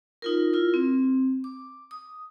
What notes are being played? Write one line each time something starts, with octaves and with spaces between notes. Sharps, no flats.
D#4 F4 A#4
E4 F4 A#4
C4
D6
D#6